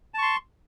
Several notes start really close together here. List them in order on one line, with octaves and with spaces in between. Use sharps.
A5 C#6 C6